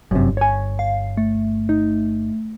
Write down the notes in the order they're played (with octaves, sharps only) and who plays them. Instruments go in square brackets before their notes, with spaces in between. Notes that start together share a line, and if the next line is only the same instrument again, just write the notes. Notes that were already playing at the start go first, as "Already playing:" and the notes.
[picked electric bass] G1 [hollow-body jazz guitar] F#2 C3
[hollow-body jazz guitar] C#5 G#5
[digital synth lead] F5
A3
[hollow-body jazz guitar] D#4